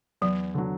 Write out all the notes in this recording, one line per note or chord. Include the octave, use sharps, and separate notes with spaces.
E2 F#3
D3 F#3